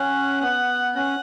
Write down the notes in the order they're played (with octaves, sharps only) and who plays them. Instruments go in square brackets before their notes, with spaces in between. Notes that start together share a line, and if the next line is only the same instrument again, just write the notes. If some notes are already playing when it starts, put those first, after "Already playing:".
Already playing: [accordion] C#4 [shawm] F#5
[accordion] B3 [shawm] F#5
[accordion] C#4 [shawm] F#5